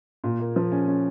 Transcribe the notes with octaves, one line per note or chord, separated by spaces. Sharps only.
A#2
A#3
F3
C#4
C#4